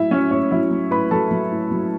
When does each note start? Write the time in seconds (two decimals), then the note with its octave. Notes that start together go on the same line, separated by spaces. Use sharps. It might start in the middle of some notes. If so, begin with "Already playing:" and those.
Already playing: A2 F#3 E4 E5
0.11 F#3 C#4 C#5
0.31 A2 C#4 C#5
0.51 F#3 E4 E5
0.71 F#3
0.91 A2 B4 B5
1.11 F#3 A4 A5
1.31 F#3
1.52 A2
1.71 F#3